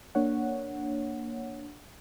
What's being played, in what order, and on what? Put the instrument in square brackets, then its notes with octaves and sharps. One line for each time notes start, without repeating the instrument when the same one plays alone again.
[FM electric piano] A#3 D4 C#5 F#5